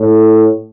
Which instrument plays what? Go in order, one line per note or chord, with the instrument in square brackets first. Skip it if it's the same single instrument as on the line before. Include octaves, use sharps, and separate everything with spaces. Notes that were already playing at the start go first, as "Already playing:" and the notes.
Already playing: [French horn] A2